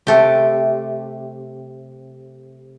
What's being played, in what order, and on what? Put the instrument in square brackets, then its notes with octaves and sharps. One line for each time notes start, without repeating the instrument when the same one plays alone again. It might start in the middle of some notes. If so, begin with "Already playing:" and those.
[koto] C3 A3 G4